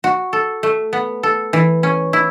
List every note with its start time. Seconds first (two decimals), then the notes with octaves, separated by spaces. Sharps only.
0.04 F#4
0.33 A4
0.63 A3
0.93 B3
1.23 A4
1.53 E3
1.83 C#4
2.13 E4